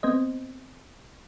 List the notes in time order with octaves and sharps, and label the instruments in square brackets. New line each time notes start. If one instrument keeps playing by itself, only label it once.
[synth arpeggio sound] B3 C4 C5 D#5